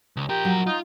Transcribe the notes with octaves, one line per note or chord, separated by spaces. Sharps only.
C#2
F3 G4 A#4
F#3
D#4 F4